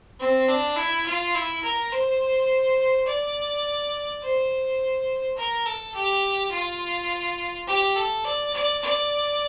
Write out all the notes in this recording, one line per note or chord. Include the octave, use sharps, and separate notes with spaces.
C4
D4
E4
F4
E4
A#4
C5
D5
C5
A#4
A4
G4
F4
G4
A4
D5
D5
D5